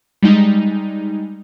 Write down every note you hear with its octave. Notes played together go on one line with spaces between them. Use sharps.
G3 G#3 D#4